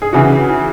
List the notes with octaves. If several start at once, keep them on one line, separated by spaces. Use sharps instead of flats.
G#4
C#3 E3 F#4